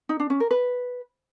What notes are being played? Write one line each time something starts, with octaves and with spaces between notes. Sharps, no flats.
D#4
D4
C#4
A#4
B4